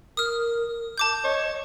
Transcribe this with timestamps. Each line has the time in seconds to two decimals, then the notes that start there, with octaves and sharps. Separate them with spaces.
0.17 A#4 D#6 F6
0.98 A5 D6 G6
1.24 C#5 D#5